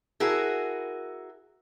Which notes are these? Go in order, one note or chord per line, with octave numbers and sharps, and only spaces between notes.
E4 F#4 G#4 A#4